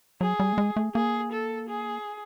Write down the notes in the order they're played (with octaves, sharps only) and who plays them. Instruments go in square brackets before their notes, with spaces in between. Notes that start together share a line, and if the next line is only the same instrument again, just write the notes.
[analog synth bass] F#3 [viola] G#4
[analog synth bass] G3
A3
G#3
A3
[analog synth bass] A#3 [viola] G#4
[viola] A4
G#4